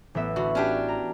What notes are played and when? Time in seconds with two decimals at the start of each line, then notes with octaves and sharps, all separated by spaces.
0.15 A1 B3 E5
0.36 D3 F#4 B5
0.55 C#4 D4 G4
0.88 A#5